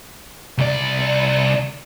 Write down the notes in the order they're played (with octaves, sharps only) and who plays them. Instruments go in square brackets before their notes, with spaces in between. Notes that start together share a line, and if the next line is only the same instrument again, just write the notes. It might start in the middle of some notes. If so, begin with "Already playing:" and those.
[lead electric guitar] C2 D5